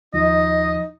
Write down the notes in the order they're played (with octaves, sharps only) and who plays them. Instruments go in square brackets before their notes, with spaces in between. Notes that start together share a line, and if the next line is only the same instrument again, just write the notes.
[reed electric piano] D#2 F3 [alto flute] D#4 [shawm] D#5